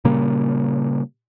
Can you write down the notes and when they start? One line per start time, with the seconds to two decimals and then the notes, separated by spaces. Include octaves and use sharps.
0.05 A#2 C#3 G3 A#3